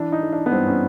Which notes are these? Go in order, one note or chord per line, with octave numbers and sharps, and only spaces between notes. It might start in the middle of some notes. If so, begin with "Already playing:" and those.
Already playing: E3 D4
D#4
E3
D4
B3
G2 C4
C#4